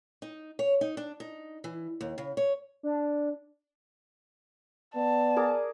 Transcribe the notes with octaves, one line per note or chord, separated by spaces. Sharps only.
D#4
C#5
D#4
D4
D#4
E3
D#2
C#3
C#5
D4
B3 D5 A5
G#4 A#4 D6